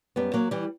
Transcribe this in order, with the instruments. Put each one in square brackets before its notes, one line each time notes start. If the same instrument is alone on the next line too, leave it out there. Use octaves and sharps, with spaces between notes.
[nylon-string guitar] F#2 G3 B3
F#3 A#3
E3 G3